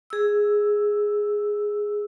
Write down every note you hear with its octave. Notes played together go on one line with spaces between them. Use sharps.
G#4 E6